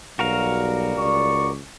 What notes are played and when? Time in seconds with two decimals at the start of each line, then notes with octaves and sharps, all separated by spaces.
0.19 B1 G3 F#4 A#4 F5
0.97 C#2 D5 C#6